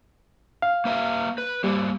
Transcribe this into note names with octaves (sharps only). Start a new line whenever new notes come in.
F5
A#3 B4 E5
B4
G3 A#3 G4 C5